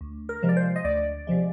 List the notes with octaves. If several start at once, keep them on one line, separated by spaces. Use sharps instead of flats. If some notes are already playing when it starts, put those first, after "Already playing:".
D2
A#4
C3 F3 G#3
D5
C5
D#5
D2 D5
C3 F3 G#3